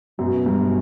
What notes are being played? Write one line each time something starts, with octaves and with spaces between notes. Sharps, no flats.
F#2 B2
G2